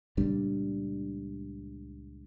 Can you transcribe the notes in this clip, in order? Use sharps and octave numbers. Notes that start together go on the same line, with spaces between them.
C#2 A#2 G3 D4